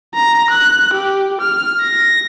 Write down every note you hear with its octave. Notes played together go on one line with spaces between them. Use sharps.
A#5
F#6
G4
F6
A#6